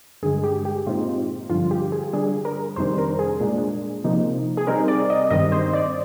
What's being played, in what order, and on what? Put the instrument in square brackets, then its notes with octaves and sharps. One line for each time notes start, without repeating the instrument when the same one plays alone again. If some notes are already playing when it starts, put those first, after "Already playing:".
[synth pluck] G2 D3 G#3 G#4
G4
G4
A#2 G#3 C4 D#4 F4
G2 D3 F3 F4
G4
G#4
D3 G3 D4 G#4
A#4
F2 C3 D#3 G3 D4 C5
A#4
G#4
A#2 G#3 D4
C3 F3 A#3 D#4
G#4
C3 G3 C4 D#4 A#4
D5
D#5
G2 D#3 G3 C4 D#5
C5
D5